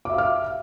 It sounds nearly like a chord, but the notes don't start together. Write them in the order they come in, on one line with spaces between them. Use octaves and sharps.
D6 E5 F5 F6